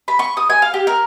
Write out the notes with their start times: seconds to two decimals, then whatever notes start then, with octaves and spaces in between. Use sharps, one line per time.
0.08 B5
0.19 C#6
0.37 D#6
0.50 G#5
0.62 F5
0.74 G4
0.87 A#4